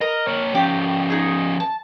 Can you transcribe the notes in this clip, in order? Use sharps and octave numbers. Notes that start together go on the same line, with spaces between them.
A#4 D#5
A#3 C#5
F3 C#4 G4 G5
D#4 G#4
A5